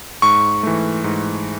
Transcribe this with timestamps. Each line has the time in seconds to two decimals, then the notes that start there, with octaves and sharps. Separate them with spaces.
0.22 G#2 C#6
0.63 E3 A3
1.04 G#2